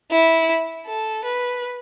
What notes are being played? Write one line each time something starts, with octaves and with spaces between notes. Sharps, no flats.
E4
A4
B4